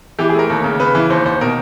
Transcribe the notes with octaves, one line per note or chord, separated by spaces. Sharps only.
E3 G4
G#4
A3 A#4
D#2
C#3
C#3 B4
E3
D#2 C5
D#2 C5
B2 A#4